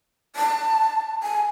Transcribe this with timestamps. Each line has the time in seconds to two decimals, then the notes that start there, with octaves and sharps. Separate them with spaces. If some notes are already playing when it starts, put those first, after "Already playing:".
0.36 A5
1.23 G#5